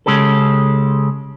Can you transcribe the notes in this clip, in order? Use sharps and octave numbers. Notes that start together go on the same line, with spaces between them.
C#3 G#3 C#4 G4 A4